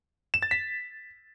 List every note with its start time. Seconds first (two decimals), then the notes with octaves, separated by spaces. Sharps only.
0.34 E7
0.42 A6
0.51 B6